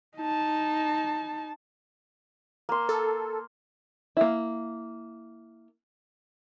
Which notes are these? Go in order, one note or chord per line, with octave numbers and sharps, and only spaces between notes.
D#4 A5
A#3 C6
A4
A#3 E4